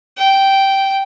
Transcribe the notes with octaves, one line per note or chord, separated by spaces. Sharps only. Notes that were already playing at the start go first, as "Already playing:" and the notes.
G5